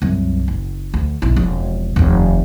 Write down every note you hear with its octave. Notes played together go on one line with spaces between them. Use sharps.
C2 F#2
F#1
D2
B1 E4
E1 F2
F1 D#2